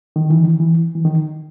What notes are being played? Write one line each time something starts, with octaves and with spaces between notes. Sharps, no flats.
D#3
E3
D#3
E3
E3
D#3